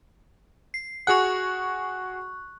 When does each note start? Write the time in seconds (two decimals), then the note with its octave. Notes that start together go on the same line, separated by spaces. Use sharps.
0.74 C7
1.07 F#4 G#4 F#5 C#6 F#6